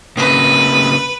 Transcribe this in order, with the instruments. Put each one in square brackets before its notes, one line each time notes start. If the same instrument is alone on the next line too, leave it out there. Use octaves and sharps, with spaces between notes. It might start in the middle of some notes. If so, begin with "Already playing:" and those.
[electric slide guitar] C#3 A#3 C4 [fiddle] B4